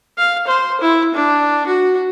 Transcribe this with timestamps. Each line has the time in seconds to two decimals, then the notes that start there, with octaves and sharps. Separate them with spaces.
0.18 F5
0.47 C5
0.81 E4
1.14 D4
1.67 F#4